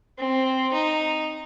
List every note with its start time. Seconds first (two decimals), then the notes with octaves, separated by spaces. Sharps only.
0.18 C4
0.73 D#4